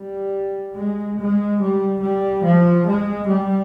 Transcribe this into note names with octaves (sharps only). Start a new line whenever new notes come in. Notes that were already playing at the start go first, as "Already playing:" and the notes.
Already playing: G3
G#3
G#3
G3
G3
F3
G#3
G3